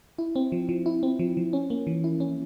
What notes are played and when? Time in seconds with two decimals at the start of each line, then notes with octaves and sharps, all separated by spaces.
0.18 E4
0.36 C4
0.52 F3
0.69 F3
0.86 E4
1.03 C4
1.19 F3
1.37 F3
1.53 C#4
1.70 A#3
1.87 E3
2.04 E4
2.20 C#4